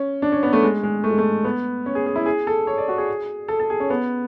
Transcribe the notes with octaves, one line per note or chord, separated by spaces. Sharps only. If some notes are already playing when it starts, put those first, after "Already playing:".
Already playing: C#4
D4
C#4
B3
A3
G#3
G#3
A3
G#3
A3
B3
C#4
G#4
G#4
E4
G#4
A4
C#5
D5
F#4
G#4
A4
A4
G#4
C#4
B3